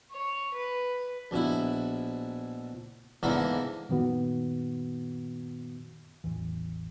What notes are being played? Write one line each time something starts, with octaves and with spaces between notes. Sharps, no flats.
C#5
B4
A#1 B2 E4
E2 G#2 D3 A#3 E4
F#2 A#2 D#3 B3 F#4
A1 E2 E3